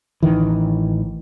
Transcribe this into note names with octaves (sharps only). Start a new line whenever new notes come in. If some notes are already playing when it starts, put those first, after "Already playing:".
A1 D#3 E3